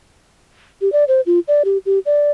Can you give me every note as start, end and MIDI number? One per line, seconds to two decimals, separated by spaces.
0.81 0.92 67
0.92 1.04 74
1.08 1.21 72
1.26 1.39 65
1.48 1.63 74
1.65 1.78 67
1.86 1.99 67
2.06 2.31 74